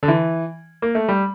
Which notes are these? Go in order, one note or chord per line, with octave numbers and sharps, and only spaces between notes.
D3
E3
A#3
A3
G3